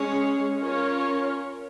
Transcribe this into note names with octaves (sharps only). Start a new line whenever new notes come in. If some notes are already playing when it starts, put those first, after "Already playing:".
Already playing: G#3 C#4 G#4 C#5
C#4 F4 A#4 C#5